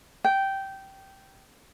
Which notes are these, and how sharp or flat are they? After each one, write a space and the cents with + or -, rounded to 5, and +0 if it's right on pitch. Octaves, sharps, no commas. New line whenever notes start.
G5 -10